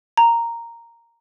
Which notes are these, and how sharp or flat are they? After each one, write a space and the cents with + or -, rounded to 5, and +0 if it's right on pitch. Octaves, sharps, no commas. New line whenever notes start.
A#5 -5